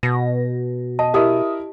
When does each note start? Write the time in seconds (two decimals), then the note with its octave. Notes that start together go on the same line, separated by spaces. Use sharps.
0.03 B2 A#6
0.99 D#5 A5
1.14 E4 G4 A#4 D#5 E5 D#6